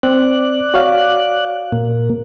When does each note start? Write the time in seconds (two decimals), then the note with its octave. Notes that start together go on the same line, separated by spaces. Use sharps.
0.03 C4 D5 F#6
0.74 F#4 C#5 F5
1.72 A#2 A#3